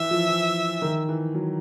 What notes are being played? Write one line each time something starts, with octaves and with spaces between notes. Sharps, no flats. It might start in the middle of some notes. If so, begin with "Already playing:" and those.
Already playing: E3 E5
F3
E3
D#3
E3
F#3